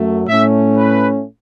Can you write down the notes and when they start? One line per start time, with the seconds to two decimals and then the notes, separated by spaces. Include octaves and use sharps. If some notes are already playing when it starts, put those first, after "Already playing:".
Already playing: F#2 F#3 A3
0.28 A2 A3 C#4 E5
0.78 B4